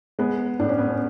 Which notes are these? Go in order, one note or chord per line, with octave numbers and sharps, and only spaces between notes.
G#3 B3
A2 D4
C#4
B3
C#4